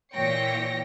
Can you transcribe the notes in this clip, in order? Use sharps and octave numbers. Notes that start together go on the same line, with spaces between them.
A#2 E3 C#5 G5 A#6 C#7